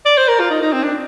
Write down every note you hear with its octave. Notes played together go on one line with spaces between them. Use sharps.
D5
C5
A#4
F4
D#4
D#4
C4
D4